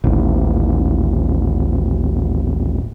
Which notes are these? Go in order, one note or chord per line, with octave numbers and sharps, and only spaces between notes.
D#1 A1